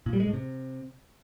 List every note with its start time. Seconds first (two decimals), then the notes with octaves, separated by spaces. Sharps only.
0.06 A#2
0.13 G3
0.20 G#3
0.27 A2
0.33 C3